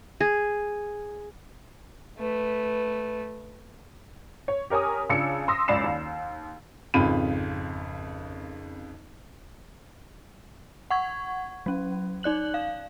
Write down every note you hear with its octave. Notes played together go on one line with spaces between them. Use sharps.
G#4
A3 B4
C#5
G4 A#4 C#5 G#5 D#6
C#3 D4 F4 E6 C#7
C6 D#6 E6 A#6
C#2 F#2 D5 B5 C7 E7
D#2
G#1 F2 C#3 F4 B5 D#7
F#5 C#6 G#6
F#3 C#4
D#4 D5 F#6 F#7
F5